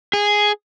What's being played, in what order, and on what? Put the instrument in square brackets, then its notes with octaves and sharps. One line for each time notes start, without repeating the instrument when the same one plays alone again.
[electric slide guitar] G#4